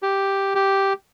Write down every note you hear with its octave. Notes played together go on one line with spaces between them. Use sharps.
G4
G4